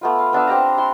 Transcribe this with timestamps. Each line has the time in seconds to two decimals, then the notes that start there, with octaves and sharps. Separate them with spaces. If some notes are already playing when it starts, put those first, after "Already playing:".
0.01 A3 B3 F4
0.19 F5
0.33 B3 D4 E5 F5
0.47 C4 G4 A5 A#5
0.78 E4 A5 C6